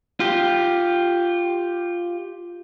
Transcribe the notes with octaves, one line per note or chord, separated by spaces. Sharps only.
F4 G4